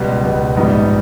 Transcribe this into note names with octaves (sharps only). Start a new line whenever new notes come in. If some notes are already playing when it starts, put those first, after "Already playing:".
Already playing: C#2 B2 G3
C#2 B2 G3
A#1 G#2 G3 B3 D#4